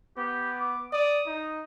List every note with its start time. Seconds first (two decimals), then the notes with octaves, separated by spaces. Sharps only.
0.17 B3 G4
0.60 D6
0.93 D5 D#6
1.27 D#4